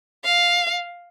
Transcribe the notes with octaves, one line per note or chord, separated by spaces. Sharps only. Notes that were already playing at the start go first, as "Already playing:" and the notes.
F5